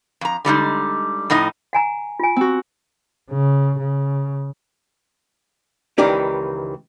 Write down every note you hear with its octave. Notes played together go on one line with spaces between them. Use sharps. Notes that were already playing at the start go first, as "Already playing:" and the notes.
F2 A#5
D3 G3 G#3 D#4
F2 A2 D#4 D#5
F#5 G#5 A#5
F4 G#5
C4 F#4
C#3
C#3
C#2 D#3 E3 D#4 G4 D5